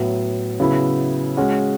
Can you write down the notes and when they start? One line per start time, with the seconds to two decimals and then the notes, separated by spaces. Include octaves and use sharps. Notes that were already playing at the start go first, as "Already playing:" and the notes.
Already playing: A2 F#3 B3
0.60 C#3 F#3 B3 E4
1.37 G#3 C#4 F#4